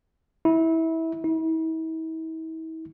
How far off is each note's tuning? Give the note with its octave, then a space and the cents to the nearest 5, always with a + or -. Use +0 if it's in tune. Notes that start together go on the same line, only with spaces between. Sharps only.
E4 -25
E4 -45